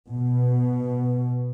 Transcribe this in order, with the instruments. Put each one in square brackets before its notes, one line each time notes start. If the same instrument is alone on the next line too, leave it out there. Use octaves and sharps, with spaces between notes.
[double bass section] B2